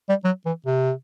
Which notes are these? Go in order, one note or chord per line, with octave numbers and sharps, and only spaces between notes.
G3
F#3
E3
C3